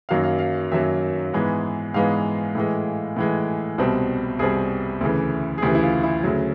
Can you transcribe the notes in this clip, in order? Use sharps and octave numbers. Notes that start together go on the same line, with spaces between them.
F#2 D#3 F#3 A#3 F5
F5
F5
F#2 D#3 F#3 A#3 E5
G#2 E3 G#3 B3
G#2 E3 G#3 B3 F5
A2 E3 G#3
A2 E3 G#3
C2 B2 G3 C4
C2 B2 G3 C4 G#4
D2 C#3 E3
G#4
D2 C#3 E3 G4
E4
F4
E4
D2 C#3 F#3